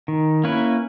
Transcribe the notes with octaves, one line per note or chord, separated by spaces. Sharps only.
D#3
A#3 C#4 E4 B4